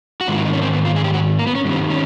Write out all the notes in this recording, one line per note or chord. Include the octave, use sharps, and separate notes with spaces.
F#4
G#2 D#3 G#3 F4
E4
D#4
C#4
C4
B3
F4
G#4
G4
F#4
A#3
B3
C#4
G2 D#3 G3
C4
C#4